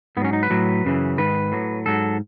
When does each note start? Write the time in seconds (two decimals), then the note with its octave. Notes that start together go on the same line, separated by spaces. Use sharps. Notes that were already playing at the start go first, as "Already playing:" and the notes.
0.17 G#2 B3
0.22 F#3 C#4
0.33 D#4
0.43 B4
0.50 A2 F#3
0.85 F#2 C#3 E3
1.18 G#2 D#3 B4
1.52 A2 F#3
1.86 G#2 F#3 A4